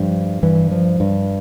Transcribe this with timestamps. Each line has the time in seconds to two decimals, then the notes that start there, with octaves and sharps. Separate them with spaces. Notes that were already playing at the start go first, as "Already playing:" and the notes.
Already playing: G2 F3
0.43 G2 E3
0.71 F3
1.00 G2